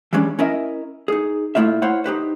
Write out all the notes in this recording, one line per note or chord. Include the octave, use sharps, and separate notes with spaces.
E3 G3 G#3 C#4 D4
C#4 E4 A#4 D#5 E5
D#4 G#4
A#2 F3 A3 E4 F4 E5
E4 C5 C#5 F5 F#5
D#4 G4 B4 C5